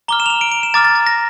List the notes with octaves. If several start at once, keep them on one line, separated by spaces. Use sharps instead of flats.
A#5 D6 F6 G7
E7
F7
E7
D7
D7
E7
A#5 D6 F6 A6
A6
A6
A#6